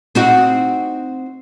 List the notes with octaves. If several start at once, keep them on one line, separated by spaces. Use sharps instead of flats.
C4 D#4 F#4